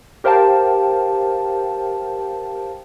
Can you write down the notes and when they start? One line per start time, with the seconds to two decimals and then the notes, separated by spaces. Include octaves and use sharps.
0.24 G4 A#4 C5 F5 G5 A5